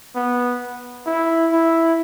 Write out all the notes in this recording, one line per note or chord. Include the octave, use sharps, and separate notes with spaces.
B3
E4
E4